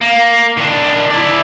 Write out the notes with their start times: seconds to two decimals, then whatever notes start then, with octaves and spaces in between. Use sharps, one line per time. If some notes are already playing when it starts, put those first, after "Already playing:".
0.01 A#3
0.57 D#3 D4
1.10 E4 D5